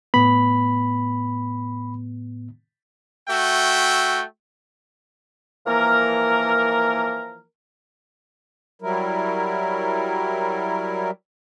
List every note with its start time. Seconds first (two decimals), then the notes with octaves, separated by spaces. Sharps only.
0.14 A2 B3 B5
3.29 A3 F#4 E5 G5
5.67 E3 F3 A#3 A#4
8.82 F#3 G3 E4 A#4